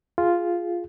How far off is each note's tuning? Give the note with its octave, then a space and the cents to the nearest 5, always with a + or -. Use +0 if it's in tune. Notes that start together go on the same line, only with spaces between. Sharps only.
F4 +0 G#4 +0